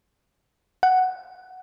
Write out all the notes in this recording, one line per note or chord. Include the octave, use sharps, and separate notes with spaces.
F#5